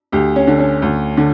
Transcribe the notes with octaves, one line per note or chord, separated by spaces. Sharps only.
D2 G4
C#4
D3
C#4
D2
D3